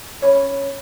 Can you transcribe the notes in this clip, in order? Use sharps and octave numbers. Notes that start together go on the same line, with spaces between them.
C#4 C#5 B5